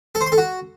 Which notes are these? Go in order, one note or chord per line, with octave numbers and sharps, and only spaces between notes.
A4
C5
C6
A4
F#4